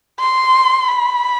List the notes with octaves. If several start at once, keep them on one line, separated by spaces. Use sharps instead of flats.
C6
B5